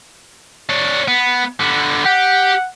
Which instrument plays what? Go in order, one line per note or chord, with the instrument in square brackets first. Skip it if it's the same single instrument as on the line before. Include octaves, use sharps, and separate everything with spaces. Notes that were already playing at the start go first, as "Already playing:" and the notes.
[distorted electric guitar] D4 C#5
B3
D3 B3
[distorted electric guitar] G4 [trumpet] F#5